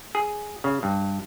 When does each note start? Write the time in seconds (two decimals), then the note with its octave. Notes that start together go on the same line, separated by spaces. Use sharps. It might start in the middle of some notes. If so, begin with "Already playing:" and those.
0.15 G#4
0.64 C#3
0.83 G2